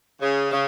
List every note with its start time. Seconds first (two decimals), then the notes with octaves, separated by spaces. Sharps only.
0.21 C#3
0.52 C#3